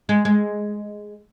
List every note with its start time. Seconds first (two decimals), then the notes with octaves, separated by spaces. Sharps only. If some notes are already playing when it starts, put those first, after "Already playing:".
0.09 G#3
0.25 G#3